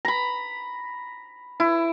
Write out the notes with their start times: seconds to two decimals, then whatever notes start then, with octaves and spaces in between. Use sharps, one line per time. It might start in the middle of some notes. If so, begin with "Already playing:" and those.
0.05 A#5 B5
1.60 E4